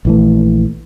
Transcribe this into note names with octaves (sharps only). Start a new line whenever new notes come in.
A#1 E3 A3